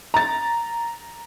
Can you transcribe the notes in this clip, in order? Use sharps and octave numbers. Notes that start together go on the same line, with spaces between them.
A#5 A6